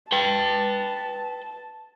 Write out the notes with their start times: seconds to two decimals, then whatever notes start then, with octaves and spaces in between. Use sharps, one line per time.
0.12 B4 G5 A5